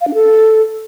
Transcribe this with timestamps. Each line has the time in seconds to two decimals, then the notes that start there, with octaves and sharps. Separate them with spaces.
0.01 F5
0.08 D4
0.14 A4